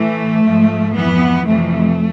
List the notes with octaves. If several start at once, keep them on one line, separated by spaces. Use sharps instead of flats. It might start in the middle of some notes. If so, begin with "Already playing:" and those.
Already playing: A2 E3 A3
G#2 F3
F2 E3 B3
F2 C3 E3 A3